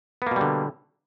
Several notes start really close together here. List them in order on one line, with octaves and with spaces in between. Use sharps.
B3 A#3 B2 G3 D3